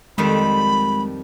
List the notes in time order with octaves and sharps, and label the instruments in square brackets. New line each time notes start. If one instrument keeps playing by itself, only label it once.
[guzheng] F2 D#3 G3 [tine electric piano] G#3 [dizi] B5